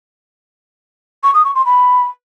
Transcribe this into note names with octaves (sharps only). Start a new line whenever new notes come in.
C#6
D#6
C#6
C6
B5